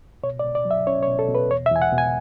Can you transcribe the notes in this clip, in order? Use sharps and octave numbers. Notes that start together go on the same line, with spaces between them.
B2 C#5
D5
B2
D5
F#3
E5
C#4 C#5
C#5
B2
A4
B2
B4
E2 C#5
E5
E2 G#5
F#5
B2
G#5